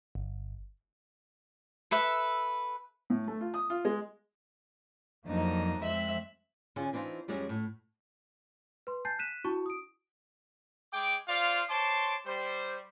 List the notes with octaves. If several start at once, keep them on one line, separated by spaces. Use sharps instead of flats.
G1
A4 B4 E5
A2
A3
F4
D#6
F4
G#3
F2 F#3 A#3 D4 D#4
F2 F3 G#3 C4 E5 F#6
D3 C#4 F4 G#4 G#5
E3 C4 D4 D#4 F4
F2 G3 G#3 C#4 G#4
A2
B4 C6
G#5 A5 G6 A6 C7
F#6 B6 D#7 E7
D4 E4 F#4 A5 C#6
D#6 D7
G#3 G#4 G5 D6
F4 C5 D5 F5
C5 C#5 A5 C6 D6
G3 C5